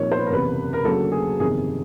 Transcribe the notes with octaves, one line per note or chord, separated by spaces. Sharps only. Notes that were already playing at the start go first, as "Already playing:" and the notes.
Already playing: C2 A#2 F3 A#3 D#4 C#5
C5
B4
A#4
F#1 E2 C3 B4
A#4
D2 C#3 F#3 A#3 A4
G#4
G1 F2 C3 D#3 G#4